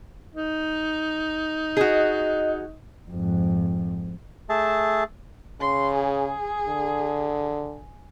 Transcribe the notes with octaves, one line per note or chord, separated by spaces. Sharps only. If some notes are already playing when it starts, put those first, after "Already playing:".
D#4
F#4 G#4 D#5
F2 G#2
A3 G#4 E5 A5
C#3 C6
G#4
D3